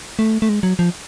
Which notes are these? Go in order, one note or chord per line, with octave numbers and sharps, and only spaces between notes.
A3
A3
G#3
F#3
F3